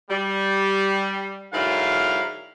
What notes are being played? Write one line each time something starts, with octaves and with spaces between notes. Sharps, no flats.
G3
G#2 D3 F#3 E4 A#4 F5